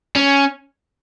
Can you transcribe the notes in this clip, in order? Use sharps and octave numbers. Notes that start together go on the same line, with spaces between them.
C#4